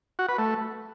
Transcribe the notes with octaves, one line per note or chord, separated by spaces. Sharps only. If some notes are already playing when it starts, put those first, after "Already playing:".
F#4
B4
A3